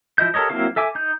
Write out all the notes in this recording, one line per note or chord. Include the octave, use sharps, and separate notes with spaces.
F3 E4 D#5 G6
G4 A4 A#4 C#5 D#5
F#3 A#3 C4 E4 F5
A4 E5 G#5 D6
D#4 G6